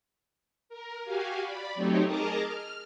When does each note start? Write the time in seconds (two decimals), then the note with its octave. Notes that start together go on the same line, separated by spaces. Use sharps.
0.69 A#4
1.03 F#4 G4 F5 G#5
1.42 D5 B5
1.75 F#3 A3 C4 D#4 G4 C#5
2.04 G#4 A#4 D#5 A5 A#5 D6
2.42 F6